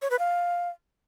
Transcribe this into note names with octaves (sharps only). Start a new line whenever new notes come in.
C#5
B4
F5